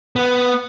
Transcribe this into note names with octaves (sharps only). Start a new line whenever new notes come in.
B3